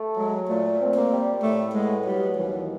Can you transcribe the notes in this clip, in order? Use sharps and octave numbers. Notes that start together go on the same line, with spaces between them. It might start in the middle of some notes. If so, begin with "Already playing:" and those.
Already playing: A3
F#3 G#3
A#2 A3
C4
A#3
G3
A2 A3
G#3 B3
F#3 G3
D#2 E3